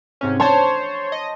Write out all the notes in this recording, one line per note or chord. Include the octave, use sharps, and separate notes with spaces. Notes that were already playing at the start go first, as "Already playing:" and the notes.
G#2 C3 C#4
C5 C#5 A5 C6
D#5